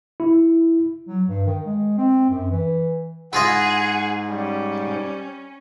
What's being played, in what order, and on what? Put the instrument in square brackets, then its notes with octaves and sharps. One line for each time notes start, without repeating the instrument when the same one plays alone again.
[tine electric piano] E4
[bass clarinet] F#3
G2
D#3
G#3
C4
F#2
E3
[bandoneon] G#2 [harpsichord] E4 F4 D#5 [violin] G#4 [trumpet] F#5
[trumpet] G3 [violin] C#4